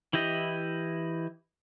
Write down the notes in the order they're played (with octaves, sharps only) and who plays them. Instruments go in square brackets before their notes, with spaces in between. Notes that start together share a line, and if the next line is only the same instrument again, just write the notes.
[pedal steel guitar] E3 E4 G4 D#5